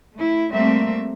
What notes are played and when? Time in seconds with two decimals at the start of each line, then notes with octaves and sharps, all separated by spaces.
0.14 A3 E4
0.52 G3 A3 A#3 C4 E5